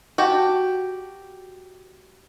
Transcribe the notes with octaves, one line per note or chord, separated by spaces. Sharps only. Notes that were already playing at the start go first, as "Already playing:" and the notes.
F#4 G4 A5